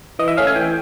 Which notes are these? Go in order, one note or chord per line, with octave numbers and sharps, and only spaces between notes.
E3 D#5
E5
A3 C#4 F5
G#5
E3 G5